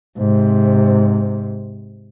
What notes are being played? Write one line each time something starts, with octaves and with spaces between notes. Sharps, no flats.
G#2 C3